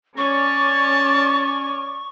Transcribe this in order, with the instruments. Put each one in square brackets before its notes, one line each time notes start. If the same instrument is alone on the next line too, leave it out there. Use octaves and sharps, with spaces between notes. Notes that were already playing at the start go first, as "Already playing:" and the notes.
[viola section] C#4 C#5 D5 [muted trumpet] A5 [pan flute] C#6